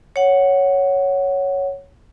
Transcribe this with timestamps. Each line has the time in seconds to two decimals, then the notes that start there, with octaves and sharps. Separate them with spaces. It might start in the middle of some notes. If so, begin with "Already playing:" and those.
0.16 C#5 F#5